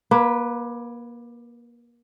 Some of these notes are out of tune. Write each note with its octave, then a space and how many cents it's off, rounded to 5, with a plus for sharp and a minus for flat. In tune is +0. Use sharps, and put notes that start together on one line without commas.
A#3 +30 B4 +0